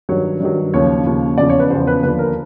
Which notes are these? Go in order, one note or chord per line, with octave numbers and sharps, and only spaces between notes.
G2 D#3 F#3 C#5
G2 D#3 F#3
D#2 C#3 F3 C#5
D#2 C#3 F3
E2 C#3 F3 D5
C#5
B4
E2 C#3 F3 C5
B4
D#2 D3 F3 B4
A#4